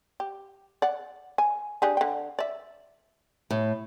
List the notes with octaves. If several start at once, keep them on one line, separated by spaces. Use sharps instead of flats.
G4
D5 F#5
G#5
D4 G4 G#4
D3 G5
D5 E5
A2